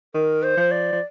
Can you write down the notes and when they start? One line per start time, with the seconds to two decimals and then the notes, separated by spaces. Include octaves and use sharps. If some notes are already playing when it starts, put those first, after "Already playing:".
0.15 D#3 A#4
0.43 C5
0.57 F3
0.71 D5
0.92 F3